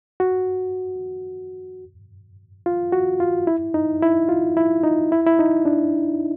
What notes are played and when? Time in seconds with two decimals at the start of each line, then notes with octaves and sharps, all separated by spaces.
0.20 F#4
2.66 F4
2.92 F#4
3.20 F4
3.47 E4
3.74 D#4
4.02 E4
4.29 F4
4.57 E4
4.83 D#4
5.12 E4
5.27 E4
5.39 D#4
5.65 D4